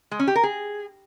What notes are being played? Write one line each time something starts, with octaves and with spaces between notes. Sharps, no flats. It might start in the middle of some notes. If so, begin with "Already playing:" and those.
G#3
C#4
G4
A#4
G#4